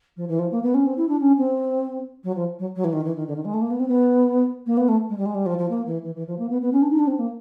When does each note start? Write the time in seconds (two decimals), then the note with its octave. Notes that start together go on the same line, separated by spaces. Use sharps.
0.16 F3
0.28 E3
0.39 F3
0.51 A#3
0.63 B3
0.74 C#4
0.85 C4
0.97 E4
1.08 D4
1.20 C#4
1.38 C4
2.23 F#3
2.35 F3
2.59 F#3
2.75 F#3
2.84 E3
2.93 D#3
3.04 E3
3.16 D#3
3.27 D3
3.35 D#3
3.45 G#3
3.53 A3
3.61 A#3
3.70 B3
3.79 C4
3.88 B3
4.66 A#3
4.77 B3
4.88 A3
5.09 G#3
5.17 G3
5.25 G#3
5.34 G3
5.46 F3
5.58 F3
5.69 A#3
5.86 E3
6.03 E3
6.15 E3
6.27 F3
6.38 A#3
6.50 B3
6.61 B3
6.72 C#4
6.82 D4
6.90 D#4
6.99 D4
7.07 C4
7.18 A#3